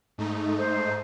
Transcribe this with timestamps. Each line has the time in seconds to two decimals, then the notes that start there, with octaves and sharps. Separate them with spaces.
0.18 G#2 A3 D#4
0.58 C5